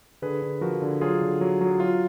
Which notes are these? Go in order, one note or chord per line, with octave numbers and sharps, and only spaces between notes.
D3 G#4 B4
D3
F3 F#4 A#4
D3
F#3 F4 G#4
D3
F#3
F#3
F#3 F4